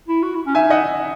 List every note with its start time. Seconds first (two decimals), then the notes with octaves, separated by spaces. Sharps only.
0.08 E4
0.22 F#4
0.35 E4
0.46 C#4
0.55 D#4 E5 G#5
0.70 D#5 F#5